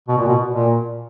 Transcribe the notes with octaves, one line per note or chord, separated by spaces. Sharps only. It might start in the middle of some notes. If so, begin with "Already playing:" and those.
B2
A#2
B2
A#2